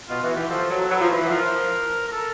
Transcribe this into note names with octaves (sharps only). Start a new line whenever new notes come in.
B2 F4
E3 F#4
E3 G4
F3 A4
F#3
F#3 B4
F3
E3
E3
F3 A#4
A#4
A4